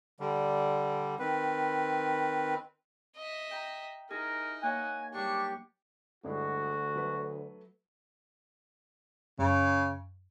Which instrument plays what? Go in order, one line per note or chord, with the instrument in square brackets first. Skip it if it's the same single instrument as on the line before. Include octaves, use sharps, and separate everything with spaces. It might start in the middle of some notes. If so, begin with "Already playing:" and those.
[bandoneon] D3 G3
D#3 C4 B4
[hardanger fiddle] D#5 E5
[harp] G5 A#5
[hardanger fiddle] D#4 [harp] E4 G#4 [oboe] A#4
[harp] A#3 C#5 D#5 [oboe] F#5 [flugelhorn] G#5
[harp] G#2 F#3 G3 [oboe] D4 [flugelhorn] G4 [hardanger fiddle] C#6
[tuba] D2 [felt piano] G2 G#3 E4 [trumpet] F#4
[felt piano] F#3 A3 B4
[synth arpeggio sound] F#2 [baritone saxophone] C#3